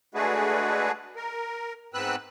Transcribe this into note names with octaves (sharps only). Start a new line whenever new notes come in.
G#3 A3 D4 F#4 G#4 B4
A#4
G#2 B3 C4 B4 E6 F#6